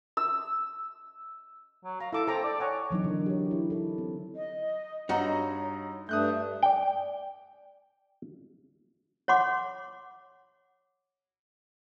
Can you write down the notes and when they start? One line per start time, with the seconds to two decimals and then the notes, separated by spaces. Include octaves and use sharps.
0.17 E6
1.84 F#3
2.00 F5 A#5
2.13 E4 A4 D6
2.28 C4 A4 A#5 D6
2.44 D5
2.60 C#5 F#5 G#5
2.90 E3 F#3 C4 D#4
3.04 D3 A#4
3.26 G4 C#5
3.51 E4
3.70 E4 A4
3.98 C4
4.35 D#5
5.09 G2 D#4 F#4 C#5 D#5 A#5
6.09 G2 A3 D4 D#6 F#6 G6
6.63 D5 G5
9.28 C#5 F#5 C6 D6